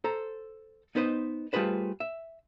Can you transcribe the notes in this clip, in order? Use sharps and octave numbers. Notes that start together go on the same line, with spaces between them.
A4 C5 A#5
B3 D#4 B4 C5 D#5
G3 A3 F4 G#4 B4 C5
E5